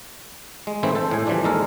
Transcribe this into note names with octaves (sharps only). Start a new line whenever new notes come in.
G#3
A2 D#3 E3 A3 C4 E4
A4 C5
A2 G#5
C#3 E3 F3 G3 D4
D#2 G#3 A4 A#4